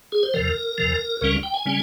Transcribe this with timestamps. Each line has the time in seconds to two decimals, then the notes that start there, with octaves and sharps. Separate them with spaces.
0.12 G#4
0.23 C5
0.34 E2 C3 F3 A#4
0.78 E2 C3 F3
1.21 C#2 C#3 G3 C#4 A#4
1.43 G5
1.54 G#5
1.66 C#3 G3 C#4